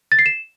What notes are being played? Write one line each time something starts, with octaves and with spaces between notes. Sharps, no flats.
A6
C7
E7